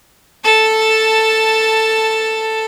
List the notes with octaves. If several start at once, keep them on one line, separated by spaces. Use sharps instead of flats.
A4 A5